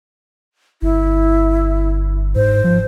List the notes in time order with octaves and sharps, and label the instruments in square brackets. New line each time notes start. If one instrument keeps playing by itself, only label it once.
[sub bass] G1 [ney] E4
[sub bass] G#2 [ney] C5
[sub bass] F3